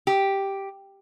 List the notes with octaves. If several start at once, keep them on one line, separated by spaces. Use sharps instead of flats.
G4